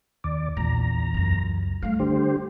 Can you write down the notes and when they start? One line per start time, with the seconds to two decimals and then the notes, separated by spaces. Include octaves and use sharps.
0.24 D#2 D5
0.57 A#1 E2 A#5
1.14 C#2 F#2
1.82 G3 A3 F5
1.99 D3 G4 C5